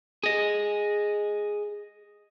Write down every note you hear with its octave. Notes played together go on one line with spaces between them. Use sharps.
G#4 D#5